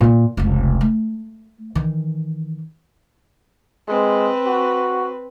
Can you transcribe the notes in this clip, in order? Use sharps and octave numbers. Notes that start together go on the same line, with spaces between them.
A#2 A#3
F1 C#2
A3
D#3 E3
G#3 C4 B4
F#4